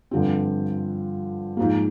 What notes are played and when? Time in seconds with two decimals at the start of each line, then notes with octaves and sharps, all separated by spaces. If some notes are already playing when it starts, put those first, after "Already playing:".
0.11 G2 D3 F3 C4
1.57 G#2 F3 A#3